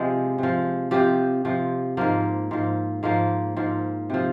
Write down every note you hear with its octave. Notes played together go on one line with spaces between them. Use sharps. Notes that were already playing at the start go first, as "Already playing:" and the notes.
Already playing: C3 F3 G#3
C3 F3
C3 F3 G4
C3 F3
G#2 F3 A#3
G#2 F3
G#2 F3 A#3
G#2 F3
C3 F3